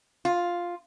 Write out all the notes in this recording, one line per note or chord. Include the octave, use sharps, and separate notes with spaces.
F4